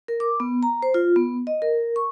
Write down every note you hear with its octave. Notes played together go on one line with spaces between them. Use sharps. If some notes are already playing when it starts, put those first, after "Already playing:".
A#4
D6
B3
A#5
C5
F4
B3
D#5
A#4
C#6